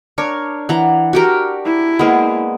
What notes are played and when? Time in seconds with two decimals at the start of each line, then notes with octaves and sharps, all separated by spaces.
0.18 D4 A#4 C#5
0.69 E3 F#5 A#5
1.13 F#4 G4 A#4
1.65 E4
1.99 G#3 A#3 B3